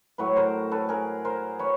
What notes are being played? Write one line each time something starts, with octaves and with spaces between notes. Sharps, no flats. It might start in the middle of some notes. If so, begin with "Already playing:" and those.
A2 F#3 B4 C#5
A#4 C5
A4 B4
G#4 A#4
A#4 C5
B4 C#5